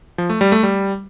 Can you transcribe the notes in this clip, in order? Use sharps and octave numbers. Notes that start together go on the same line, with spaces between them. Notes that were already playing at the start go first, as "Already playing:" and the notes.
F3
A3
G3
A3
G3